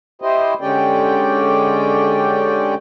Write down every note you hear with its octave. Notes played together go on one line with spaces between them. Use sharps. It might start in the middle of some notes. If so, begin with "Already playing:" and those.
E4 G4 C5 D#5
D3 G#3 C#4 G4 D5 G5